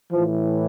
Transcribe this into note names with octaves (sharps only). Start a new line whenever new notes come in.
A2 E3 F3